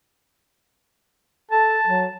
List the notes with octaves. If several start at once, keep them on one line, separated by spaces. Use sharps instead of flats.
A4 A5
F#3